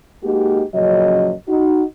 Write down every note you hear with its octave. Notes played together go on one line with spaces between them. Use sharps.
G#3 A#3 D#4 F#4 G4
F#2 A#2 C#3 F3 F#3 D#5
D#4 F#4